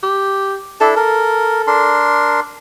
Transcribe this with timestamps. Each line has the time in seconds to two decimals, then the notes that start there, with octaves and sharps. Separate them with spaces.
0.03 G4
0.81 D4 E4 A4
0.96 A4 A#4
1.67 D4 A#4 C6